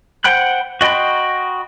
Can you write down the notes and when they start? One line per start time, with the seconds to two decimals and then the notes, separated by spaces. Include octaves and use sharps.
0.24 C5 F#5 G5 B5 F#6
0.81 F#4 D#5 G5 B5 C6